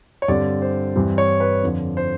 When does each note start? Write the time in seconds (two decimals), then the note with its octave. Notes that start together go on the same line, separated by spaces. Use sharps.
0.22 C#5
0.28 G2 D3 G3 C4 D5
0.62 C5
0.96 G2 E3 G3 C4
1.18 C#5
1.40 B4
1.63 F2 D3 F3
1.97 C5